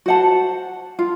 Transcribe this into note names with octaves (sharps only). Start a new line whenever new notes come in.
F#4 C5 F#5 A5
F4